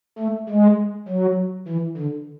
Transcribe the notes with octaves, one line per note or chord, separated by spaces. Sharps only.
A3
G#3
F#3
E3
D3